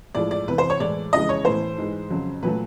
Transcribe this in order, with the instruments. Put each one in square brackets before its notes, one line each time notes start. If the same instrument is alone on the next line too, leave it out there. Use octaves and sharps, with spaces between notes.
[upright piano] A2 F3 G#3 D5
D5
E2 C3 E3 B4
C5
C#5
A2 E3 G#3 D5
F2 C#3 E3 G#3 D#5
C#5
A2 E3 A3 C5
G#2 E3 G#3
F2 C#3 F#3
A#2 F#3 A3 B4